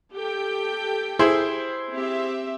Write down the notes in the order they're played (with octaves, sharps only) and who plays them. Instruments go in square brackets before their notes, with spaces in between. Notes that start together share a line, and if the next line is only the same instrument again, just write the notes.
[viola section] G4 A4 G5
[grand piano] E4 G#4 C5
[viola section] C4 G4 E5